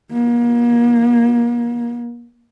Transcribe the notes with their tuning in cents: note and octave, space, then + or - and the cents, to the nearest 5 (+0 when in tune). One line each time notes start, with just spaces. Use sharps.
A#3 +35